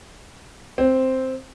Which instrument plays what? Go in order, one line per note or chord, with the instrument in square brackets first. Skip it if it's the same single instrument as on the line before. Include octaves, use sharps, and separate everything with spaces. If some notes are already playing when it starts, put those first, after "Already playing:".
[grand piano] C4